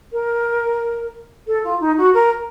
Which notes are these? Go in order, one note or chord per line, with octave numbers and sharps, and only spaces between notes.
A#4
A4
F4
D#4
F#4
A#4